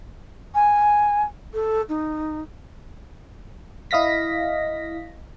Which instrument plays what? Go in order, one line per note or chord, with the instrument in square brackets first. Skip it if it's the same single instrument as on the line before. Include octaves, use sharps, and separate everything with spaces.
[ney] G#5
A4
D#4
[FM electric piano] E4 D#5 F5 A#6 B6